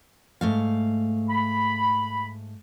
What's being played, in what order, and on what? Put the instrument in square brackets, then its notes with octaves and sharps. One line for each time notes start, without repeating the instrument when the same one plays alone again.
[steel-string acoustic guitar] G#2 A3 F5
[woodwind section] B5